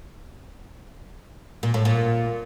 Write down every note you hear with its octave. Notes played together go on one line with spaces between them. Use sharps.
A#2
A2
A#2